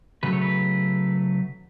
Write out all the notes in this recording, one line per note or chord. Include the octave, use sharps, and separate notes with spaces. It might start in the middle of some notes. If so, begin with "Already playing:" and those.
C#3 F#3 A3 B4
C#5
B4